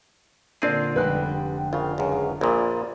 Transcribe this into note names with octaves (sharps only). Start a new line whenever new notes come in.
A#2 D3 C4 D4 F4 G#4 D5
F1 D3 G3 G#3 B4 G5 F#6
A#1 C#3 F4
C#2 F#2 G#4
F4
A#1 A#2 A#3 F4 B5 D#6